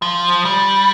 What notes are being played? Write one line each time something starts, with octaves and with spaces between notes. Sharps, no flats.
F3
G3